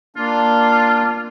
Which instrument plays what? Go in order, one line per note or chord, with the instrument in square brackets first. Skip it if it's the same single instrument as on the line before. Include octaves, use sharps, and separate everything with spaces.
[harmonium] A#3 D4 [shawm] F4